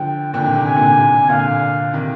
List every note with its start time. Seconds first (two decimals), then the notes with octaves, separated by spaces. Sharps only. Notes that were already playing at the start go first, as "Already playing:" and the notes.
Already playing: D3 F3 G5
0.33 A#2 D3 G5
0.44 C3 D#3
0.55 C3
0.66 C3 G#5
0.76 A#2 D3
0.87 C3
0.97 C3
1.29 A#2 D3 F5
1.93 C3 D#3